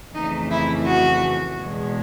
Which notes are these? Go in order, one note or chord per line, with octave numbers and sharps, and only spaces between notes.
F2 C#3 E3 A3 D#4
E4
F#4
E2 B2 G#3